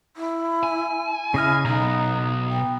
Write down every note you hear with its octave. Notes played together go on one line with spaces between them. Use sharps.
E4
G#5
C#3 E4 D#5 F6
B1 B3 D#4 A#5
G5